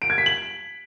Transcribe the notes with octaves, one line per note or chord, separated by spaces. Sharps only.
D7
G#6
B6
F#7